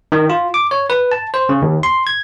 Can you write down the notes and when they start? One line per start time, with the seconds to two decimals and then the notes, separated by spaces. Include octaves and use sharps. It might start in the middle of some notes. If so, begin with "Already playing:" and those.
0.12 D#3
0.30 F4
0.54 D6
0.71 C#5
0.90 B4
1.12 A5
1.34 C5
1.49 C#3
1.62 D#2
1.83 C6
2.07 G#6